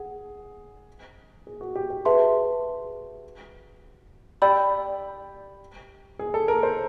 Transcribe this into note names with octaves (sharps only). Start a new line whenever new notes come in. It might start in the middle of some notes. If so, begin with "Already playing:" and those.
Already playing: G#4 F#5
G#4
F#4
G4
G4
F#4 G#4 B4 E5 A5 C6
G4 D5 G5 B5 E6 G6
G#4
A4
A#4
C5